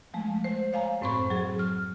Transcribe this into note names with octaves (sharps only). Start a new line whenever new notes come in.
F3 G#3 A3
C5
C#5 F5 G#5 A#5
F#2 A2 C4 C5 B5 C#6
F#3 G#4
F6